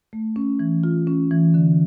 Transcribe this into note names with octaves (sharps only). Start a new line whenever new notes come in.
A3
C#4
E3
F4
C#4
E3
D3